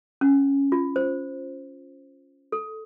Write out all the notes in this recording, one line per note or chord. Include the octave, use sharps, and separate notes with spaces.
C#4
F4
C5
A4